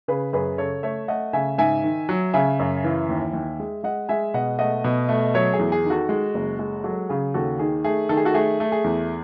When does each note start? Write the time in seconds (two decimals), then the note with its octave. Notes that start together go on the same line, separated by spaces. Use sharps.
0.08 C#3 G#4 B4
0.33 F#2 G#4 B4
0.58 C#3 A4 C#5
0.83 A3 C#5 E5
1.08 A3 D#5 F#5
1.33 C#3 E5 G#5
1.58 G#2 E5 G#5
1.84 D#3
2.09 F#3
2.34 C#3 E5 G#5
2.59 F#2
2.84 E3
3.09 D#2
3.33 D#2
3.60 G#3
3.83 G#3 D#5 F#5
4.09 G#3 E5 G#5
4.34 B2 D#5 F#5
4.59 A3 D#5 F#5
4.84 B2
5.09 A3
5.34 F#3 C#5 E5
5.53 G#4
5.59 E2
5.72 G#4
5.84 D#3
5.90 F#4 A4
6.09 G#3
6.35 F#1
6.59 G#3
6.84 F#3 F#4 A4
7.09 C#3 G#4
7.34 D#2 F#4 A4
7.59 D#3 G#4
7.84 A3 G#4
8.09 D#3 A4
8.17 G#4
8.25 F#4 A4
8.34 A3 G#4
8.60 A3
8.72 G#4
8.84 E2